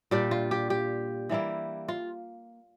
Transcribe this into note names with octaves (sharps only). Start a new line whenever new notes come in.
A#2 G3 D4 G4
F4
G4
G4
E3 G3 A#3 E4
F4